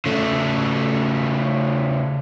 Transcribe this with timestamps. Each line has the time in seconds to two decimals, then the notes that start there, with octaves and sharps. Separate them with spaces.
0.06 C#3 A3